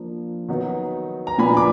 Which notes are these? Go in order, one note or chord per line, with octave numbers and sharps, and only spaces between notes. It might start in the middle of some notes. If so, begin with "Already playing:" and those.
Already playing: F3 A#3 D4
D#3 F#3 B3 D#4
A#5
A#2 F3 B3 D4 G#5 B5
D6